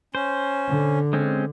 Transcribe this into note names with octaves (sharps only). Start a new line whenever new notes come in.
C#4 C5
D3
G#3 C4 C#4